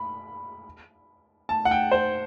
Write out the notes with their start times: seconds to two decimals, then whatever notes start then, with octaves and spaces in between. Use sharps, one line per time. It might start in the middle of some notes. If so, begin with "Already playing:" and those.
Already playing: B5
1.49 A5
1.65 F#5
1.71 G5
1.91 C5